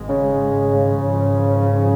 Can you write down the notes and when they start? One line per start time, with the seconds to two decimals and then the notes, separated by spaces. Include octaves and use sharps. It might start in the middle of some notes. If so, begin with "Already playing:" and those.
Already playing: G#1 G#2 G#3
0.09 C#3
1.01 G#1 G#2 F3 C#4